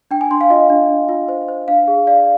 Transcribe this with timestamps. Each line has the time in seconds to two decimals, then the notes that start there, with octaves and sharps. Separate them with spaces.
0.11 D4 G5
0.21 G#5
0.31 D4 C6
0.41 F5
0.50 F4 D#5
0.70 D4
0.89 D4
1.09 F4
1.29 C5
1.48 C5
1.68 D4 F5
1.88 G#4
2.07 D5 F5